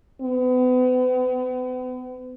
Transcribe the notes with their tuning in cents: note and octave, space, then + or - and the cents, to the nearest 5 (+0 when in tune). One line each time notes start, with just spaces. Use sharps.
B3 +40